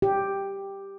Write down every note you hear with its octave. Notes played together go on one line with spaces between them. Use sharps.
G4